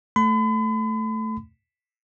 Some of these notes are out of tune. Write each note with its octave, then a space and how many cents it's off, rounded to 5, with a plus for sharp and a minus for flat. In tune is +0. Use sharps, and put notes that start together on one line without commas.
A3 +0 B5 +40